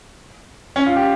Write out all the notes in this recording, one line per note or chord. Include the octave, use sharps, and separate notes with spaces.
C#4
F4
G4